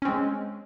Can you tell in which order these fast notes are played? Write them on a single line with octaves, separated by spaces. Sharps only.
C#4 C4 G#3